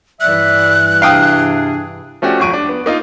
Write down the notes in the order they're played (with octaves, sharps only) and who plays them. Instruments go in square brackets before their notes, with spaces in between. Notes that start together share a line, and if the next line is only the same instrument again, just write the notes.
[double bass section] G2 E3 [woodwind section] D5 E5 [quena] F#6
[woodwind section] C3 D4 G#4 [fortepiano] F5 G5 D#6
[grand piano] F3 A3 C#4 F#4 G4 D5
D#1 G#1 F2 C#6 D7 D#7
D4
B3
A#3 D#4 F4